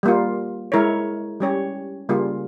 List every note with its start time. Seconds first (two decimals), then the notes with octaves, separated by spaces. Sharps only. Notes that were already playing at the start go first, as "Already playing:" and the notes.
0.03 G3 A#3 F4
0.72 G#3 E4 A#4 C#5
1.40 G3 C#4 G4 C#5
2.09 C#3 G3 A#3 F4 G#4